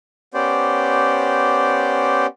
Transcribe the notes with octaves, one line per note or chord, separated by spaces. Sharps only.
B3 C#4 G4 C5 D5